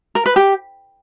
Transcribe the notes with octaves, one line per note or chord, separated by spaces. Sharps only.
A#4
B4
G4